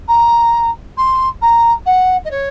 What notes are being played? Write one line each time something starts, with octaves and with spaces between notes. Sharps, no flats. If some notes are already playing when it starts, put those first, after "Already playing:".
A#5
C6
A#5
F#5
D#5
C#5